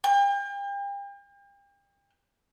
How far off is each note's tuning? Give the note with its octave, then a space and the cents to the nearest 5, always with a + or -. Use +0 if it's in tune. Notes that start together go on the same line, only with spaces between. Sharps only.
G5 +40